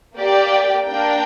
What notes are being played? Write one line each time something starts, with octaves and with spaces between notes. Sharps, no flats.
A#3 G4 D5 G5
A#3 D4 A#4 G5